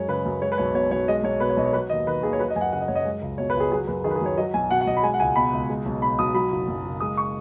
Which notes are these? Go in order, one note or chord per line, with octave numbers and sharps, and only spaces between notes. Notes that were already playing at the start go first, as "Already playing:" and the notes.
Already playing: F#2 G#3 C#5
C#3 B4
F#2
G#3 C#5
B4
B1 C#5
B2 C#5
B1 C#5
G#3 D#5
B1 C#5
B2 B4
C#5
B1 D#5
C#5
F#3 B4
D#2 D#5
D#3 B4
D#2 G#4
C#5
F#3 B4
D#5
F#2 G#5
F#5
C#3 F#5
D#5
F#2 C#5
D#5
G#3
C#2
B2 C#5
B4
C#2
G#4
F#3 G#4
F#2 B4
D#3 G#4
B4
G#4
F#2 C#5
F#3 D#5
B1 G#5
B2 F#5
F#5
B1 D#5
B5
G#3 G#5
F#5
C#2 G#5
B2 B5
C#2
G#3
B1
B2 B5
B1 D#6
F#3 B5
F#1
F#2
F#1
G#3 D#6
C#6